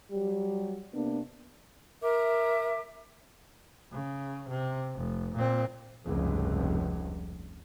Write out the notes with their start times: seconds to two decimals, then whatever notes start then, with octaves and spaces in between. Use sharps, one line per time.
0.11 F#3 G3 G4
0.94 C3 A#3 B3 D4
2.02 A#4 E5 D6
3.92 C#3
4.50 C3
4.95 F1
5.35 A#2 C4
6.04 F1 C#2 G2